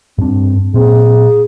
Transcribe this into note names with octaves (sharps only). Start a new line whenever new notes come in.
G2 C4 D4
A#2 C4 G#4